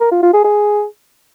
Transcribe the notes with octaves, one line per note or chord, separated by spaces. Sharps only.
A#4
F4
F4
G#4
G#4